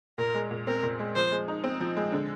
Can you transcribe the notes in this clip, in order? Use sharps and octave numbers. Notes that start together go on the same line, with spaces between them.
A#2 A#4
G#3
A#2
C4 A#4
A#2
G#3
F3 C5
G#3
D#4
C4
F3
G#3
D3